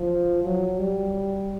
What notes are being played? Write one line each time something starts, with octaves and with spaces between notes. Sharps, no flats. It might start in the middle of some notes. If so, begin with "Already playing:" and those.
Already playing: F3
F#3
G3